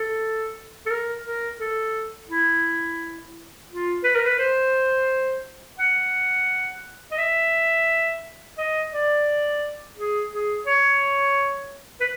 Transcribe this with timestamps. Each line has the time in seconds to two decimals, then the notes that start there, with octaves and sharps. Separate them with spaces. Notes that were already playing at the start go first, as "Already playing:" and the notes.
Already playing: A4
0.86 A4
0.91 A#4
1.26 A#4
1.60 A4
2.29 E4
3.69 F4
4.04 B4
4.16 A#4
4.26 B4
4.39 C5
5.79 F#5
7.12 D#5
7.18 E5
8.58 D#5
8.92 D5
9.97 G#4
10.32 G#4
10.66 C#5
12.01 B4